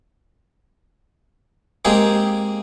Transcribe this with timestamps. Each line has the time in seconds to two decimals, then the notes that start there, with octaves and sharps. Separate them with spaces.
1.85 G#3 A#3 C4 G4 G#4 C5